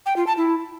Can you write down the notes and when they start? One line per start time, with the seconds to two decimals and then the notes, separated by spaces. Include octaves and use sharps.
0.06 G5
0.16 F4
0.27 A5
0.37 E4